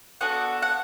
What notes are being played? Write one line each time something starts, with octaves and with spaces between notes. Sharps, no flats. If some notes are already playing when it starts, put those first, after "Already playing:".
B3 D4 F#4 A4 F#5
F#5